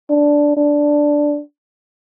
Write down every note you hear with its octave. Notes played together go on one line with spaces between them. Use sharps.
D4
D4